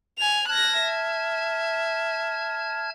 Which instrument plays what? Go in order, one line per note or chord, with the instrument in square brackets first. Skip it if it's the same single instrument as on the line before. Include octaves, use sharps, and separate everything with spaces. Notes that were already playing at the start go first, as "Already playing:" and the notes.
[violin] G#5 F7
[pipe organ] A5 F6 G#6 [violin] F#6 A#6
[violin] E5